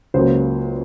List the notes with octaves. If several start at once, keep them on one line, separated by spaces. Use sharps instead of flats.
C#2 C#3 F#3 A#3 C5